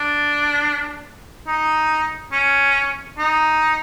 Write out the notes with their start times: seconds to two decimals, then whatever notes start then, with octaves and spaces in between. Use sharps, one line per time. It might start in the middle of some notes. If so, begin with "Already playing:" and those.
Already playing: D4
1.47 D#4
2.32 C#4
3.18 D#4